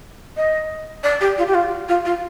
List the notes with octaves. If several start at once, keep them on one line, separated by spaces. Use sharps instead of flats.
D#5
D5
G4
F4
G4
F4
F4
F4